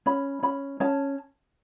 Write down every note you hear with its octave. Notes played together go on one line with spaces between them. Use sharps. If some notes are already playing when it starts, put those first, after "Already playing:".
C#4 B5
C#4 B5
C#4 A5